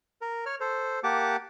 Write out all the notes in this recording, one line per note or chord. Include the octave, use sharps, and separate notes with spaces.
A#4
C#5 F6
A4 C5
A#3 G4 F#5 A5 D6